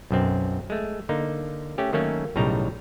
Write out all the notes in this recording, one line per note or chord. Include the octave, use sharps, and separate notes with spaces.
B1 F#2 C4
G#3 A3
D3 A#3 D#4
A3 C#4 G4
D#3 F#3 A3 A#3 C#4
B1 A2 C#3 G3 D#4 A#5